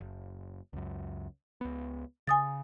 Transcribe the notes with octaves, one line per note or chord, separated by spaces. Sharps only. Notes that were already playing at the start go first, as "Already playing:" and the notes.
F#1
C#2 F#2
C#2 B3
C#3 G#5 D#6 A6